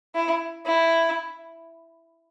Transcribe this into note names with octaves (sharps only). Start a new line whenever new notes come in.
E4
E4